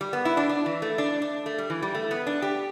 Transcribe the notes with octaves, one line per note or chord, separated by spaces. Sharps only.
G3
B3
E4
D4
D4
E3
A3
D4
D4
A3
G3
E3
G3
A3
B3
D4
G4